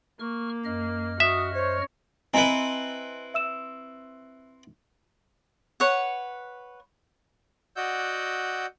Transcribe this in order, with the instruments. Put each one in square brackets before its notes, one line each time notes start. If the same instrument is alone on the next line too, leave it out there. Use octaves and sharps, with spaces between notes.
[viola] A#3 [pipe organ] C#6 F6
[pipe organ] F#2 D#5 F6
[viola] F#4 [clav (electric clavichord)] E5 [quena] D#6
[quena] C5 [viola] C#5
[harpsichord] C4 E4 B4 [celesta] D#5 G#5 A#5
[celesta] E5 E6 E7
[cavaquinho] B4 C#5 F#5
[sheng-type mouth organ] F#4 D5 D#5 F#5 E6 G6